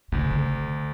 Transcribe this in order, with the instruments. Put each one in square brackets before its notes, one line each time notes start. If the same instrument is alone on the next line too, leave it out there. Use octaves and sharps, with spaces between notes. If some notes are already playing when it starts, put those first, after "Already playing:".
[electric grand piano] D2 [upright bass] C#3
[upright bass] D3